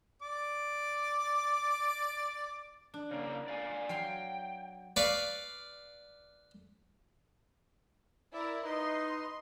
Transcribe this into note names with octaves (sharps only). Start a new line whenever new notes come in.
D5 D6
D4
C#3 A#3
D5 F5 G#5
F#3 F5 G5 C6
B4 D5 F5 C#6
E4 A#4 D5 E5
D#4 B4 D#5 C6